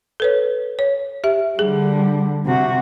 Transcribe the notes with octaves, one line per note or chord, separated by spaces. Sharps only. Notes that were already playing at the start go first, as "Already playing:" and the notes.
A4 B4 C#5
C#5
G4 E5
D3 G3 G#4
C3 F#4